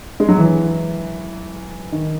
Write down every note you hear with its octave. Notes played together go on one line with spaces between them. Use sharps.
G#3
F#3
E3
D#3